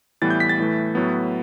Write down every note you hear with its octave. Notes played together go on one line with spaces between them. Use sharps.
A2 E3 G3 B3 A6
G6
B6
A6
A2 E3 A3
A2 F#3 B3